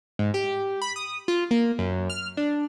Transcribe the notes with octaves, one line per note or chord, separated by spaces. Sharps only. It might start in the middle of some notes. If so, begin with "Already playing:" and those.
G#2
G4
B5
D#6
F4
A#3
F#2
F6
D4